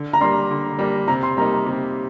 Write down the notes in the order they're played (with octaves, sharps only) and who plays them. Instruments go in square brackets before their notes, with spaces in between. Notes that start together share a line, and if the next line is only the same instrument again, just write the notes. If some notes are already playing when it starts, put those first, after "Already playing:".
Already playing: [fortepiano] D3
[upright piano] A#5
[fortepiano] G3 A#3 D4 [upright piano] C6
[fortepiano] D3
G3 A#3 D4
[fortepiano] C3 [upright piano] A#5
[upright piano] C6
[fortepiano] G3 A#3 D#4 [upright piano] A#5
[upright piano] A#5
[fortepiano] C3